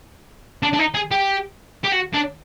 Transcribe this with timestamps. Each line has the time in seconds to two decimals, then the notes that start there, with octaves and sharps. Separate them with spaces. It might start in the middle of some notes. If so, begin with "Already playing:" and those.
0.63 D4
0.73 D4
0.79 D#4
0.94 G#4
1.11 G4
1.84 G4
1.92 F#4
2.14 D4